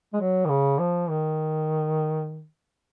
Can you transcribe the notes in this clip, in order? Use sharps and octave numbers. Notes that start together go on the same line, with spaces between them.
G#3
F#3
D#3
C#3
F3
D#3